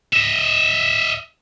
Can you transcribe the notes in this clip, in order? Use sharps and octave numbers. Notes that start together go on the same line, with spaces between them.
D#5 E5